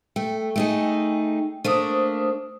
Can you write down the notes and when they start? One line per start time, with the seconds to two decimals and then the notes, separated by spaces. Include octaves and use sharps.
0.16 A3 G5
0.56 A3 D#4 G#4
1.64 A3 A#3 D4 C5 D#6